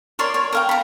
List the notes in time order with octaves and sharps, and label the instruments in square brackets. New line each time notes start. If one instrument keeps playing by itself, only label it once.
[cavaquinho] A#4 C#5 D5 C6
C#5
A#4 F5 G5
A#5 B5